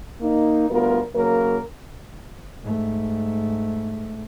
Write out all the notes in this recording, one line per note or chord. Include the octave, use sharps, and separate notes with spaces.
A#3 D#4
D2 G3 B3 F4 A#4
C#3 F#3 A#3 A#4
G#2 A3